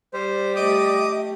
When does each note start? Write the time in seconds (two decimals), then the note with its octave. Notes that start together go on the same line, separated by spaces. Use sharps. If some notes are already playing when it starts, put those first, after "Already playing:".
0.14 G3 C5
0.56 A3 G4 D#5 D6 D#6